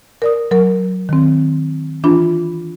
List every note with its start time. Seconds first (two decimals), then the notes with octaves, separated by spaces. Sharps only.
0.22 A#4 D5 D#6
0.51 F#3 A#4
1.09 D#3 C4
2.04 E3 D4 F4 B5